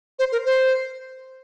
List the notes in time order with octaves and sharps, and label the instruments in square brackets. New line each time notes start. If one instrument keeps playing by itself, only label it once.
[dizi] C5
A#4
C5